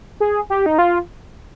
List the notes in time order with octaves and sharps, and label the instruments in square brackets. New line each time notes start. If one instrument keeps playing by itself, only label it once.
[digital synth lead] G#4
G4
D#4
F4